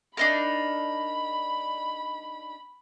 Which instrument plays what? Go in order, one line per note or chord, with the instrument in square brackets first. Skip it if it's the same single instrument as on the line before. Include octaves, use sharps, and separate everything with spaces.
[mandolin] D4 D#4 A#4 [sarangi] B5